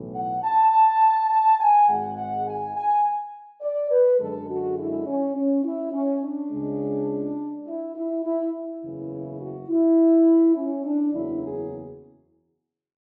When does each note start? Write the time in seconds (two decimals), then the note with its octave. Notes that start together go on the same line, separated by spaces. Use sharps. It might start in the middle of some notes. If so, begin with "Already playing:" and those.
Already playing: B1 A2 E3
0.14 F#5
0.44 A5
1.29 A5
1.59 G#5
1.88 G#1 G#2 G#3 F#5
2.16 F#5
2.46 G#5
2.75 G#5
3.62 D5
3.90 B4
4.19 F#2 D3 G#3 A4
4.48 F#4
4.78 E4
5.06 C#4
5.35 C#4
5.64 E4
5.93 C#4
6.22 D4
6.51 C#2 C#3 G#3
7.67 E4
7.95 E4
8.25 E4
8.54 E4
8.83 F#1 E2 C#3 E3
9.40 F#4
9.69 E4
10.56 C#4
10.85 D4
11.14 F#1 E2 C#3 F#3 E4
11.43 G#4